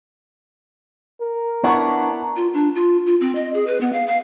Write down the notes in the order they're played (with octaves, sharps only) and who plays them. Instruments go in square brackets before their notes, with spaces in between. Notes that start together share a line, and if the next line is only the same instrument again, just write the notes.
[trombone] A#4
[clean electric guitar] B3 D4 [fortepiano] E4 F#5 C#6 [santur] C#5 D5 A#5
[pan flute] F4
D4
F4
F4
C4
D#5
G#4
B4
B3
F5
F5